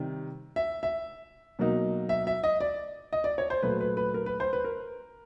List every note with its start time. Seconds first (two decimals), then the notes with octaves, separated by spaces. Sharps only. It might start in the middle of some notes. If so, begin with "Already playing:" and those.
Already playing: C3 D#3 G3
0.56 E5
0.83 E5
1.59 B2 F#3 A#3 D#4
2.09 E5
2.27 E5
2.44 D#5
2.61 D5
3.13 D#5
3.24 D5
3.38 C#5
3.50 C5
3.63 A#2 F#3 A3 B4
3.81 B4
3.97 B4
4.14 A#4
4.26 B4
4.40 C5
4.53 B4
4.64 A#4